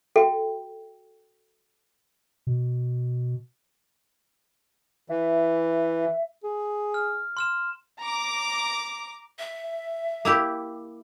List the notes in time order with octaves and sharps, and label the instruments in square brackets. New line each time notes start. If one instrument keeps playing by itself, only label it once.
[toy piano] F#4 A4 E5 G5
[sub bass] B2
[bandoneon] E3 [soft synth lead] E5
[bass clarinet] G#4
[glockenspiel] F6
C6 F6 E7
[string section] A#5 D6
[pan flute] E5
[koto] A#3 E4 G4